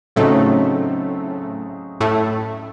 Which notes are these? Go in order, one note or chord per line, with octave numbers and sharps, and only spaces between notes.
A2 C#3 F#3 A3 C4 D#4
A2 A3